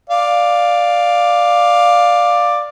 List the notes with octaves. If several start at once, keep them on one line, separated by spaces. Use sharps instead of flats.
D5 F5